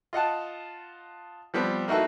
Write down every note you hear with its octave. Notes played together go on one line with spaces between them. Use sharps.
F4 D#5 F#5 A5
F3 G3 B3 C4
A#3 D#4 E4 F#4 A4 B4